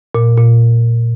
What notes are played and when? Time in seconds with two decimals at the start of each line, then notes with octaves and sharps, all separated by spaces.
0.15 A#2
0.37 A#2